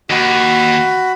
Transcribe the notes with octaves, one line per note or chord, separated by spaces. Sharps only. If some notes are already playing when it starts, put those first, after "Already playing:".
D#2 F#4 B5